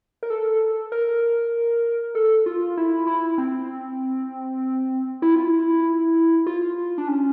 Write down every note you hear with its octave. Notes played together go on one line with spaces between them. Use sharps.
A#4
A4
A#4
A4
F4
E4
E4
C4
E4
F4
E4
F4
D4
C#4